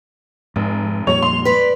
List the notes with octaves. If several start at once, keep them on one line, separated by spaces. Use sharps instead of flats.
F1 G#2
F2 A#2 G3 C#5 F7
C6
B4 D5 B6